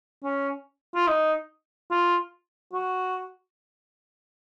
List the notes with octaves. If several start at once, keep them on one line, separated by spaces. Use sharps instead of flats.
C#4
F4
D#4
F4
F#4